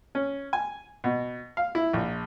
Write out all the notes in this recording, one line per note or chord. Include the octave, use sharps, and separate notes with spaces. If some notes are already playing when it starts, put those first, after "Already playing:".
C#4
G#5
B2
F5
E4
A#1